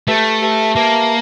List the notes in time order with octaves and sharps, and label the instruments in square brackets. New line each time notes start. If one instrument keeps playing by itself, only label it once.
[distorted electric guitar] A3 [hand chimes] G4 B4 E5 A5
[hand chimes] G4 B4 E5 A5
[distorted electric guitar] A#3 [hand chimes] G4 B4 E5 A5